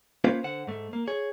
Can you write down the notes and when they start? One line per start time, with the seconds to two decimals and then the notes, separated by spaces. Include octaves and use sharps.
0.24 A#3 C#4 F4 B4 C5 F5
0.44 D3 C5 F#5
0.67 G#2 A3
0.93 A#3
1.08 G#4 C#5